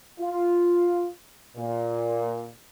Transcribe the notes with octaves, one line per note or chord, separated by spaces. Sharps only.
F4
A#2